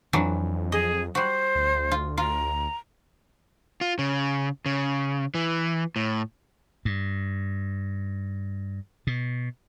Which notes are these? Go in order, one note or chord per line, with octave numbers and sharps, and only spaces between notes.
F2 E3 F#3 D4
G#4 D#5
G3 F#4 C5
D2
F4
F4 A#5
F4
C#3
C#3
E3
A2
G2
B2